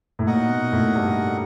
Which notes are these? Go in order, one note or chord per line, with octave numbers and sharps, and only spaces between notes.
A2
A#2 D#4 F#4 A#4 D#5 F#5
B2
A2
G2